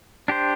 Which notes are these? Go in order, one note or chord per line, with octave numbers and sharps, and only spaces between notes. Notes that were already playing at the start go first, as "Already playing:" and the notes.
D4 G4 C5